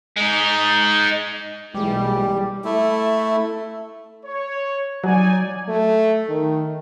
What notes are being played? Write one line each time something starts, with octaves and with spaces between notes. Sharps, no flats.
G#3 D#4
B1 A#2 E3 G3 G#3 G4
A3 E4
C#5
F#3 D#4 D5 G#5
A3
D#3